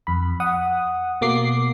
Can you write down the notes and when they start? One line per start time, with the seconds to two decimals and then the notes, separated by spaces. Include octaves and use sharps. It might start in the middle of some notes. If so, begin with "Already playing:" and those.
0.07 F2 B5
0.40 F#5 D#6
1.21 B2 A#3 D6 C7